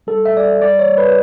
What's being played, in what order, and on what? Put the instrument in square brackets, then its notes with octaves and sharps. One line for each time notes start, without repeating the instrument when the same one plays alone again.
[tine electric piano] G3 A4
E5
G3 D5
E5
G3 D5
C#5
G3
B4